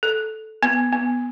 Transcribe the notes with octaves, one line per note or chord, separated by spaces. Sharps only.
A4
B3
B3